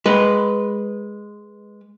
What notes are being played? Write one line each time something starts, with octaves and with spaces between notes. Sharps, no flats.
G#3 B4